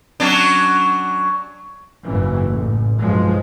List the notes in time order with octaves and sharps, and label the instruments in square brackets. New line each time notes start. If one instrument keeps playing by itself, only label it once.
[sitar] F#3 C#4 D4
[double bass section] F#1 G#2 C#3 E3
A1
B1 G2 F3 G#3